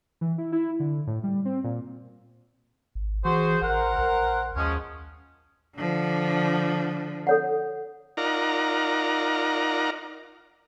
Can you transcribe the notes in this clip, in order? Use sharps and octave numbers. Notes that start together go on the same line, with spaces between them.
E3
E4
E4
D3
A2
G3
C4
A#2
G#1
E3 F#4 G#4 C5
A1 A#4 C5 F#5
A#1
D#2 F3 G#3 C#4
D3 F3
A4 C#5 F#5
D#4 F4 A#4 D5 F#5 A#5